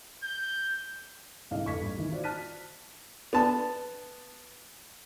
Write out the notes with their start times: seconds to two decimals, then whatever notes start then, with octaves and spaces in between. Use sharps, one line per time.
0.23 G6
1.51 C2 G#2 D3 D#5 F5
1.65 F1 A4 D#5 C#6 G#6 B6
1.81 A#1 G3
1.98 D#3 E3
2.11 F4 F#4 C5 D5
2.24 A5 F6 F#6 B6 D#7
3.33 B3 A5